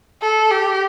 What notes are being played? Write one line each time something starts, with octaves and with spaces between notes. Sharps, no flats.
A4
G4